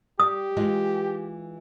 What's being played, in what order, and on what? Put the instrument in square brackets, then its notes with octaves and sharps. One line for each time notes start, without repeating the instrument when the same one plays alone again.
[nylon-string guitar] G3 [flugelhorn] G4 [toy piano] D#6
[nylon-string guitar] E3 G#3 F4